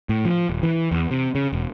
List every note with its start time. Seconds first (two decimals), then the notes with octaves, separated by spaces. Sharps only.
0.09 A2
0.25 F3
0.50 D#1
0.63 E3
0.92 E2
1.11 C3
1.35 C#3
1.53 E1